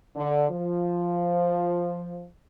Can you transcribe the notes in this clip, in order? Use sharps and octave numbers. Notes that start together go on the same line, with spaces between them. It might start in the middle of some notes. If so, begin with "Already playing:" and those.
D3
F3